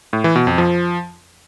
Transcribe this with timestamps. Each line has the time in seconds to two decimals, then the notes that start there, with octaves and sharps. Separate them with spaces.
0.13 A2
0.24 E3
0.36 B2
0.47 F2
0.58 F3